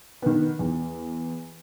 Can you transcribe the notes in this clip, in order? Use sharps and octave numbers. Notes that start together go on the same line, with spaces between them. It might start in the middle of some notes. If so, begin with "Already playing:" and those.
D#3 B3
E2